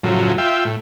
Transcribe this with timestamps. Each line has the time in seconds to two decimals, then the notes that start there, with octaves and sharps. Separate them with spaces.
0.03 F#2 A2 C#3 F3 F#3
0.38 F4 E5 G5
0.65 A2